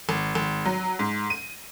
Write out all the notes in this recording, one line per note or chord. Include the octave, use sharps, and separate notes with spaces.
G#1
G#1
F#3
G#2
D#7